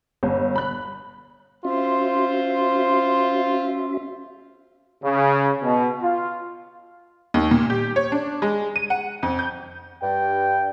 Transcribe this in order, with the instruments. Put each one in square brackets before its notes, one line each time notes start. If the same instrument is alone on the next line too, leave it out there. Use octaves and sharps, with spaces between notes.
[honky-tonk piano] G1
B5 F#6
[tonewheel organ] C#4 F#4 E5 [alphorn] F4 [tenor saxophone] C5
[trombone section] C#3
B2
F4
[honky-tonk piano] D#2
A#2
G4
C#5
D4
G#3
D#7
F#5
F2
G6
[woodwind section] G2 [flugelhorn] G5